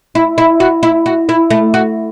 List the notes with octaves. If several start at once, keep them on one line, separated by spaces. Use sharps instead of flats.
E4
E4
F#4
E4
F#4
E4
A3
F#4